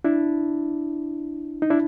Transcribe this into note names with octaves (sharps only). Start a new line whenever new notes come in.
D4 E4
D#4
D4 E4